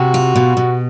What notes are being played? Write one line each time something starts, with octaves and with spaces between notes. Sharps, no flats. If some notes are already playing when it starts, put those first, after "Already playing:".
Already playing: C3 F#4
F4
B2
B2